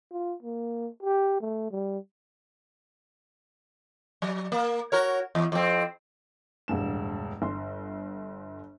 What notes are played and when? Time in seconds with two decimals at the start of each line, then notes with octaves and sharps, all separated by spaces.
0.12 F4
0.43 A#3
1.03 G4
1.41 A3
1.71 G3
4.22 F#3
4.52 A#3
4.92 F#4 A#4 C#5
5.35 E2
5.52 F2 C4
6.68 E1 A1 G2 E7
7.42 G1 C6